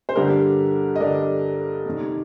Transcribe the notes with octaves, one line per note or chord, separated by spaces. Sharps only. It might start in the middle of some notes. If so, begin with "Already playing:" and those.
C5
G2 D3 G3 D4 G4 A#4
D#5
G2 D3 G3 D4 A#4 D5
F2 C3 D#3